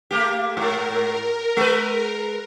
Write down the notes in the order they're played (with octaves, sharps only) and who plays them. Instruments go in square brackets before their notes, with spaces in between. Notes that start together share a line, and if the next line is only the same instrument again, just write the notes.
[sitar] A3 A#3 G4
[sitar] G#2 [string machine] A#4
[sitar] G#3 B4